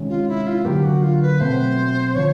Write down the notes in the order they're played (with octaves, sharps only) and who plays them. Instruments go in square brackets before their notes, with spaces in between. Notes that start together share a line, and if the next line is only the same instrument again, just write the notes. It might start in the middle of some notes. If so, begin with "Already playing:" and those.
Already playing: [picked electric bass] C3 D#3 G#3 C#4
[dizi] F4
E4
F4
[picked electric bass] D3 F#3 A#3 [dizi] G4
[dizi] F#4
F4
B4
[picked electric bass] B2 F#3 A3 C4 [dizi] C5
[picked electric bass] D3 F3 [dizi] C#5